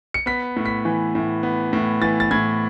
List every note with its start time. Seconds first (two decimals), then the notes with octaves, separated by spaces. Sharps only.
0.14 C#7
0.26 B3 B6
0.56 A2
0.65 B6
0.85 E3
1.15 A2
1.43 B3
1.73 A2
2.02 E3 A6
2.20 A6
2.31 A2 G#6